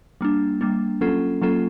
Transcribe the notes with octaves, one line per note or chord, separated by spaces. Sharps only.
G3 A#3 D4
G3 A#3 D4
F#3 A#3 C#4 F4 A4
F#3 A#3 C#4 F4 A4